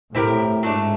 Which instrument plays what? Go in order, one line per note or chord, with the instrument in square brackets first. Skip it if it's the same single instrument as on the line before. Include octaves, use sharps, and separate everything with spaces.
[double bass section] A2 [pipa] C4 E4 G4 A#4
[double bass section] G#2 [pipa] F#3 A3 D4